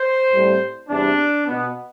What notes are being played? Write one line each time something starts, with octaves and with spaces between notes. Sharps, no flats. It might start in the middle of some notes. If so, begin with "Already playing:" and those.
Already playing: C5
A2 G3 C4
E2 C3 G3 D4
B2 B3